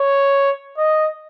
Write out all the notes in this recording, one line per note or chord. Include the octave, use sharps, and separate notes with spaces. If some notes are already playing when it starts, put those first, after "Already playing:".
Already playing: C#5
D#5